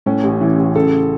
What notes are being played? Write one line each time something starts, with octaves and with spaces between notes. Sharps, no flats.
A2 C#4
A1
E3
A1
C#3 A4